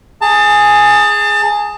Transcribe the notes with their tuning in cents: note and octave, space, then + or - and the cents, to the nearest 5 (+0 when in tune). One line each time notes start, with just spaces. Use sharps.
G#4 +0 A5 +30